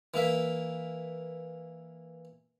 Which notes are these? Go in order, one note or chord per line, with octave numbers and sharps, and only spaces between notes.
E3 A#3 E5